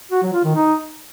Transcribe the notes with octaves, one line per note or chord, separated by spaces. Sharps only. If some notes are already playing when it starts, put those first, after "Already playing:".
F#4
F#3
F4
D#3
D#4